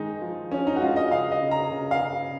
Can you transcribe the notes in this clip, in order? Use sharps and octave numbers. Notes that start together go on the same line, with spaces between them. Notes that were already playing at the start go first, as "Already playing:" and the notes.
Already playing: D#3 G#3 D#4
F3
F3 C#4
D#4
F#4
G#3 F4
D#5
C#3 F5
D#5
C#3
A#5
C#3
F5
C#3